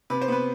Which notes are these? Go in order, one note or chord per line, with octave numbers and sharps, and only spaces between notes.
C3 B4
C5
B3 B4